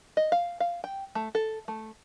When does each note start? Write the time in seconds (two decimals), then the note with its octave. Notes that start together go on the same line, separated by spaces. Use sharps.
0.17 D#5
0.32 F5
0.60 F5
0.84 G5
1.15 A3
1.35 A4
1.68 A3